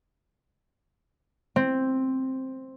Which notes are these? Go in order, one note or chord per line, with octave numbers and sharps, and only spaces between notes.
C4